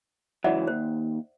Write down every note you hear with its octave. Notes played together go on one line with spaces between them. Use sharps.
C#2 E3 F#3 D5 E5 F#5
D#2 C5